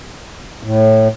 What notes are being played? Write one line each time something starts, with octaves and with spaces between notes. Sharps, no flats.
A2